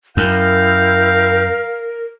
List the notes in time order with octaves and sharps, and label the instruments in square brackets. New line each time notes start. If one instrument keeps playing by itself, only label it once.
[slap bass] F#2 [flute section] E4 G5 G6 [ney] A#4 [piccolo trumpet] F5